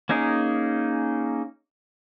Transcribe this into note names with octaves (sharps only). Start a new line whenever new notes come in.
A#3 C#4 D#4 G#4 A#4